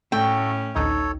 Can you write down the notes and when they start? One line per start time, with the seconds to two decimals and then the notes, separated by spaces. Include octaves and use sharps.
0.12 A2 A3 C#4 F#4 A4 G5
0.75 A1 D2 D#4 A4 C#5